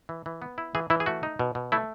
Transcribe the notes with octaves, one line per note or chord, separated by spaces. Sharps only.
E3
E3
B3
E4
E3 G#4
E3 E4
G#4
A3 F#4
D#4
B2
B2
A3 E4